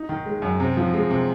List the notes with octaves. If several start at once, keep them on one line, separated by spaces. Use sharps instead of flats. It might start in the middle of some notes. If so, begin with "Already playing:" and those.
Already playing: D#4
D#3
G#3
F#2
C3
F3
G#3
C3